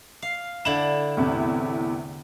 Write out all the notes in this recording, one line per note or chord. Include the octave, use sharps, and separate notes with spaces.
F5
D3 E4 E7 F#7
E2 A2 C3